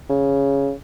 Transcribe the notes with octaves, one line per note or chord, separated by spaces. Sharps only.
C#3